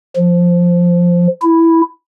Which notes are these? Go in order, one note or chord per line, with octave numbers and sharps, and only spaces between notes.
F3
E4